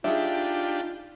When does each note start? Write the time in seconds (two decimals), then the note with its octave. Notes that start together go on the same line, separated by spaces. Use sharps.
0.04 D4 D#4 F4 G4 G#4 E5